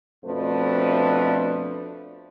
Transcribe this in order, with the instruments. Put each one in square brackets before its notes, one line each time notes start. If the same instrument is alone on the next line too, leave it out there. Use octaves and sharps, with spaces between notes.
[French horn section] F2 B2 F3 A3 D4 B4